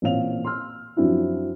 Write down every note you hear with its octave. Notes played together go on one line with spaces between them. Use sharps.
A1 A#2 C4 C#5 F5 F7
C6 E6 F6
F#2 F3 C4 D4 E4 F#4